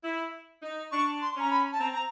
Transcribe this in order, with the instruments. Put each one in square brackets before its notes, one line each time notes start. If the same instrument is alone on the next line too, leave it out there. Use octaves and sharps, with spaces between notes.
[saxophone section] E4
D#4
[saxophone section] D4 [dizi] C#6
[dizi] C6
[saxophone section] C#4 [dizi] A#5
[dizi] B5
A5
[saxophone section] C4 [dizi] A#5
[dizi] A#5